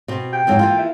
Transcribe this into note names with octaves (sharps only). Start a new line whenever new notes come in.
B2 C4
G5
F2 G#2 F#3
E3 A#3 F4
E4